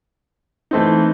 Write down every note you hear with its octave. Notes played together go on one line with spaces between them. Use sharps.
E3 A3 C4 D#4